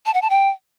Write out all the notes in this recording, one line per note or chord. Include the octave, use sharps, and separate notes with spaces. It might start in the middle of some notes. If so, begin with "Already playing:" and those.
A5
F#5
A5
G5